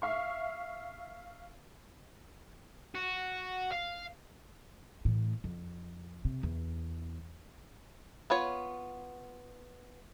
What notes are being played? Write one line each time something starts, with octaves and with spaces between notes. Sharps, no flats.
E5 F5 C#6
F#4
F5
A2 E3
F2
C3
E2
B3 F4 C#5